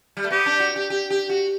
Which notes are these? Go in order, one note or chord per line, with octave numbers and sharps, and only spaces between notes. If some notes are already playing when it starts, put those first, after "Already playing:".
G3
A3
B3 G4
D4
F#4
G4
G4
G4
F#4